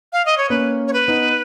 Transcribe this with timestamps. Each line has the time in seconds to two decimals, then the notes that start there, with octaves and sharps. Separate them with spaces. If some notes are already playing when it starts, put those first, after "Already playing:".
0.13 F5
0.26 D#5
0.38 C#5
0.50 A#3 C#4 B4
0.88 C#5
0.93 B4
1.08 B3 D#4